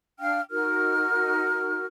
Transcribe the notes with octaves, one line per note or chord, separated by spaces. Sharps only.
D4 F5 G5 F6
D#4 F#4 A#4 F6